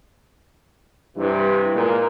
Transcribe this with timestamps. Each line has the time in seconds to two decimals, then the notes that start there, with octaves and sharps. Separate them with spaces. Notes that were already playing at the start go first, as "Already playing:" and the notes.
1.17 G2 C3 E3
1.74 A#2 G#3 A#3